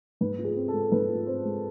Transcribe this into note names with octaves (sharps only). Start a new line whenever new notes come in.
G#2 B4
F4
G#4
C4
A4
G#3
G#2 B4
F4
C4 C5
G#3